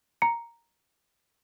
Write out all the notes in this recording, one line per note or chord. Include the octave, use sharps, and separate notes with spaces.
A#5 C#7